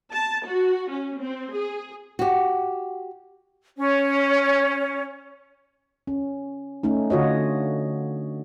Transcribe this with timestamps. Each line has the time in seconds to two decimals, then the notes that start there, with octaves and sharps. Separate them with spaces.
0.13 A5
0.46 F#4
0.91 C#4
1.22 C4
1.54 G#4
2.19 F#4 G4
3.78 C#4 C#5
6.07 C#4
6.83 A3 C#4 D#4
7.10 D3 F4 F#4 C#5 D#5